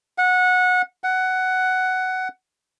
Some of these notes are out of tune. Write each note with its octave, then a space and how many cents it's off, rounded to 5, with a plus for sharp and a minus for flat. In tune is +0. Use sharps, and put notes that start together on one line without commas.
F#5 -20
F#5 +10